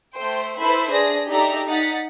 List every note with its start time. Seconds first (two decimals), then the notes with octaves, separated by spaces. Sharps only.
0.17 A3 C5 G5
0.59 E4 A4 B4 C5 E5 B5
0.91 D4 G#4 A#6
1.29 D#4 G4 A4 D5 E5 A#5
1.68 D#4 F#5 A6 B6